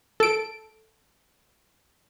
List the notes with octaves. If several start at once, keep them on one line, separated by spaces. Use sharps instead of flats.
A4 D7